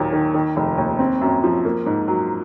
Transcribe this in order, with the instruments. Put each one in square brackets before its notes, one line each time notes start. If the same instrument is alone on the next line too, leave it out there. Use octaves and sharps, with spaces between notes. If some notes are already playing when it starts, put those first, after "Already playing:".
Already playing: [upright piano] D#2 A#2 F#3
D#3
D#3
F1
D#2
C4
F#2
F3
A#3
G#2
F#3